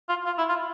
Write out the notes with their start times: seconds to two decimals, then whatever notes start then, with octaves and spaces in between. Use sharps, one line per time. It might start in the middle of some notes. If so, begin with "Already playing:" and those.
0.09 F4
0.26 F4
0.38 E4
0.49 F4